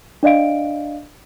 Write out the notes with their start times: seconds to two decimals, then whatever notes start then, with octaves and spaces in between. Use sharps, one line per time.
0.23 D4 D5 D#5 F5 D7